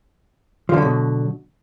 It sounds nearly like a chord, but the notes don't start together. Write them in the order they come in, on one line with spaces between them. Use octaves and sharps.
F3 D3 F#3 B2